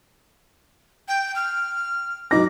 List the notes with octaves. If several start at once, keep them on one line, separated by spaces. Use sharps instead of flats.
G5
F6
F#3 D#4 D6 A#6